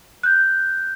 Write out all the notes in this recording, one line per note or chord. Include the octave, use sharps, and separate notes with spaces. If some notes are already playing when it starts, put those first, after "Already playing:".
F#6 G6